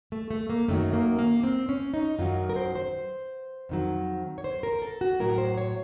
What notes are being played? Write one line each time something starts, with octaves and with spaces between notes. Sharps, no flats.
A3
A3
A#3
F#2 D#3 F#3 A3
A#3
A#3
C4
C#4
D#4
F#2 D#3 F#3 F4
A#4
C5
C5
F2 D#3 F#3
C#5
C5
A#4
A4
F#4
A2 F#3 A#4
C5
C#5